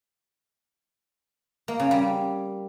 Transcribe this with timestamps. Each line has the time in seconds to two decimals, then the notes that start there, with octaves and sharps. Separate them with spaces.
1.68 A#3
1.80 C#3
1.91 G3